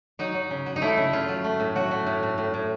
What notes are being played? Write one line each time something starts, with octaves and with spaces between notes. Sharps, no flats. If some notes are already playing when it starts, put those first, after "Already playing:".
F#3 D#4
F#3
C#3
F#3
D#4
A3 E4
C#3
C#3 F4
F#3
A3
A2
F#3 F#4
A3
A2
A2
A2
A2